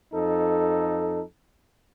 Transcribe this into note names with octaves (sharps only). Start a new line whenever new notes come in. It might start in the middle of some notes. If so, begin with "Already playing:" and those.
F2 D#4 A4